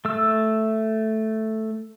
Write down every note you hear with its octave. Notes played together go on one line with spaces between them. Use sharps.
A3 E6